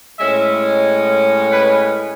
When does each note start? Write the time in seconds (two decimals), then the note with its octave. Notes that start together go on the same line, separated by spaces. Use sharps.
0.19 A2 G#3 C#4 E5
1.50 B4